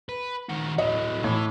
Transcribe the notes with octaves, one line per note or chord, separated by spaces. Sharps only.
B4
D#3 F#4
A2 F#3 D#5
A2 E3